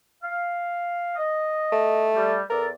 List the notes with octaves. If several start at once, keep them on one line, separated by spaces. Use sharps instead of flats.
F5
D#5
A3
G3
E2 A4 A#4 D5